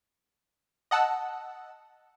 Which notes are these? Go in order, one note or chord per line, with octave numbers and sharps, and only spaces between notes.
D#5 F#5 A5 E6